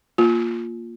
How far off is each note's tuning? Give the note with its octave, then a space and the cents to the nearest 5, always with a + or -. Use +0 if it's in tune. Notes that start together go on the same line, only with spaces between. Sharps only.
A#3 +0 F4 +0